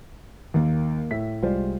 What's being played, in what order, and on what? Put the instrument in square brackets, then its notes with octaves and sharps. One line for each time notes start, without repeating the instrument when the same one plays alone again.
[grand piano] D#2 [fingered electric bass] D#3 A#3
[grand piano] A2 E5 B6
[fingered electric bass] C2 G3 G#3 [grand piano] F4 C5 D5